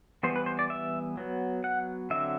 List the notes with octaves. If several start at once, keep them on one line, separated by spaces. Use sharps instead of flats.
E3 G3 B3 C5
B4
C5
D5
E5
F#3 B3
F#5
D3 F#3 C4 E5